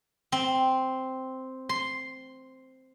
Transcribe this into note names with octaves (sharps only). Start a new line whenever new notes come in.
C4
C6